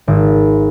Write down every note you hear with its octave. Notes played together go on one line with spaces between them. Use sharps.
G#1